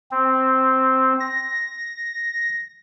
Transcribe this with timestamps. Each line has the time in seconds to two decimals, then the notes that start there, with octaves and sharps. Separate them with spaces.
0.11 C4
1.20 A#6